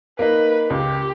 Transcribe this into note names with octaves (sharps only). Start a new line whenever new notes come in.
A#3 D#4 B4
C#2 G4